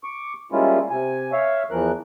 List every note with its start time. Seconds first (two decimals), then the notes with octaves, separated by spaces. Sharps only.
0.04 C#6 D6
0.52 G3 G#3 A#3 C#4 E4 F4
0.90 C3 G#5
1.32 C#5 E5 F5
1.71 E2 E3 F3 A#4 F#6